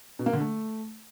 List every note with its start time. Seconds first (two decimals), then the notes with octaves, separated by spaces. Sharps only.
0.19 B2
0.26 A#3
0.33 D3
0.40 A3